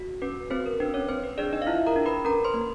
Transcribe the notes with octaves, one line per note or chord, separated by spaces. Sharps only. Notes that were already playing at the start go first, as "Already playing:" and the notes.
Already playing: F#4
C#4 B4
C4 F#4 C5
A#4
D4 B4
C#4 C#5
C4 C5
B4
D4 G#4 D5
D#4 D#5
F5
E4 F4 E5
A#4 A#5
D4
B4 B5
C#4 A#4 A#5
C5 C6
A#3